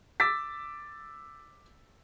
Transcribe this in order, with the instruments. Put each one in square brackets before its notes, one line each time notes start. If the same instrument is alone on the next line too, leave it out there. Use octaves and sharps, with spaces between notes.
[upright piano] D6 E6 A6 B6